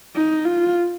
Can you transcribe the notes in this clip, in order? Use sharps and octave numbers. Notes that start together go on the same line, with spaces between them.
D#4
F4